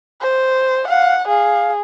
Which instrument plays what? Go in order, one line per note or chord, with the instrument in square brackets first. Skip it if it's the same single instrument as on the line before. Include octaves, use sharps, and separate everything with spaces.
[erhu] C5
[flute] F5 [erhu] F#5
[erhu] G#4 [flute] F5